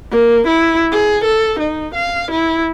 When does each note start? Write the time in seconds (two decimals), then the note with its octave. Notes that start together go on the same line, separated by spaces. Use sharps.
0.11 A#3
0.47 E4
0.92 G#4
1.24 A4
1.59 D#4
1.94 F5
2.31 E4